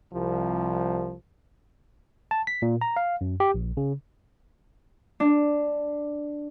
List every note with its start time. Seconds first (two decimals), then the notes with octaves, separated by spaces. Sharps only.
0.13 C2 F3
2.31 A5
2.47 B6
2.62 A#2
2.81 A#5
2.97 F5
3.21 F#2
3.40 G4
3.54 A#1
3.77 C#3
5.20 D4